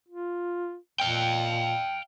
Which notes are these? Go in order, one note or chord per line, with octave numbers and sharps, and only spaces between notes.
F4
A#2 F5 G5